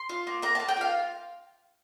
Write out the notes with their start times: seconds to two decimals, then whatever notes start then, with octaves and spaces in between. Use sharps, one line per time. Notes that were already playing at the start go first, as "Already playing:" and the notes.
Already playing: C6
0.09 F4
0.27 A#3
0.42 A#3 A#5
0.55 A#3 A5
0.68 G5
0.77 F4 F5